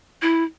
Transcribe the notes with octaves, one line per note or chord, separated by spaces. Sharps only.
E4